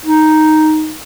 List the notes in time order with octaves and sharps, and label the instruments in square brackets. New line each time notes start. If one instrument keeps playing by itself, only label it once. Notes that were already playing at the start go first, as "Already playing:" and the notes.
[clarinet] D#4